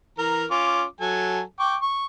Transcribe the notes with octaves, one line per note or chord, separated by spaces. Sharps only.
E3 A#4 A#5
C#4 F4 D6
F#3 A4 G#5
G5 C#6 D6
C#6